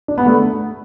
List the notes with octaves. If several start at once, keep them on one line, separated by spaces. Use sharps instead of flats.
D4
B3
A3